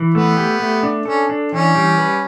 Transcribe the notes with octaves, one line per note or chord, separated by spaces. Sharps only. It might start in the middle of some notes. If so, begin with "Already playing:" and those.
Already playing: E3
A3 B3
G4
A3
D4
C#4 A4
D4
E3 C#4
G3
B4